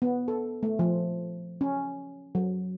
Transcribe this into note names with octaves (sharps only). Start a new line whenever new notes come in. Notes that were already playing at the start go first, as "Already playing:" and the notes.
B3
A4
A3
F3
C#4
F#3